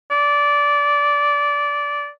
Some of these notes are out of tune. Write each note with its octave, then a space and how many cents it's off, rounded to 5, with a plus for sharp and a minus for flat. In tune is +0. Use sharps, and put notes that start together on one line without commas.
D5 -15